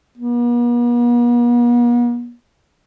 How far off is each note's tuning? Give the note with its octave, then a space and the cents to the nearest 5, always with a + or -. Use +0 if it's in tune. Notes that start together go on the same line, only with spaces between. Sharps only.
B3 -45